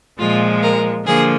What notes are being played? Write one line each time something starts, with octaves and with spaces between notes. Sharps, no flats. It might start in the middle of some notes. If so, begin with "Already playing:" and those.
A#2 F3 G#3 F4
A#4
D3 F3 A#3 G#4